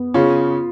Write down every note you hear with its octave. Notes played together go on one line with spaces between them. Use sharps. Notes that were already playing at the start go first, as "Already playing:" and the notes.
Already playing: B3
C#3 C#4 F4